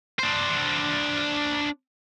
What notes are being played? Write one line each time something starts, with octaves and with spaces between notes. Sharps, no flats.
D4 C5